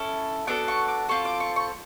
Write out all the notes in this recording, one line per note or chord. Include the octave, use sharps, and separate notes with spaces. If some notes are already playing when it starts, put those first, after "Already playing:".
Already playing: C#4 E4 A4
B3 D4 F#4 A4 D6
C#6
D6
C4 F4 A4 C#6
D6
C#6
C#6